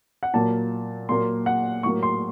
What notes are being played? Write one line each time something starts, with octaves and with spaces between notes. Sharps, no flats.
F#5
A#2 F#3 A#3 A5
A#2 F#3 A#3 C6
F#5
A2 F#3 A#3 C#6
C6